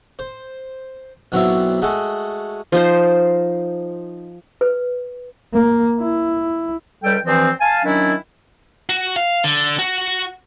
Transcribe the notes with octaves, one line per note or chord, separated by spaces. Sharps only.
C5
B1 B2 F#3 C4 E4 E5
G#3 A3 F#4 G#4 A4
F3 D#4 C5
B4
A#3
E4
C#2 G3 A4 G5
G2 E3 F3 C4
F5 G#5 A5
D#3 F#3 C#4 D4 E4
F#4
F5
D3
F#4